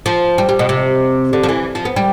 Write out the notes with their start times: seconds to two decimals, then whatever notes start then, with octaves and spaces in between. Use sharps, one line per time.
0.06 F3
0.38 G3
0.49 G3
0.59 B2
0.69 C3
1.33 D3
1.43 F3
1.49 E3
1.75 F3
1.85 B3
1.96 G3